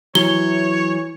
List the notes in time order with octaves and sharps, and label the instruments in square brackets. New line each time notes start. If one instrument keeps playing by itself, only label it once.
[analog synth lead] E3 [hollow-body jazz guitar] F#3 [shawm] C#5 [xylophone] G7